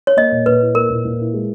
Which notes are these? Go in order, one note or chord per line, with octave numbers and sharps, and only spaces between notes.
C#5
A#3 D#5
A#2
A#2 B4
E4
A#3 A#4
A#2
A#2
E4
G#3